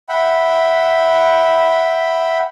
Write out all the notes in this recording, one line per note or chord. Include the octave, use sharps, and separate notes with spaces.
E5 F#5 G5 B5